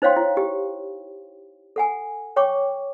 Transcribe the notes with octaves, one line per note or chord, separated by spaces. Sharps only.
D#4 C5 C#5 F5 G5 C6
E4
G4
A4 F#5 G#5
C#5 G5 C#6 D6